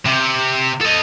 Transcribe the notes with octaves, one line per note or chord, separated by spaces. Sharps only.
C3
A4 D#5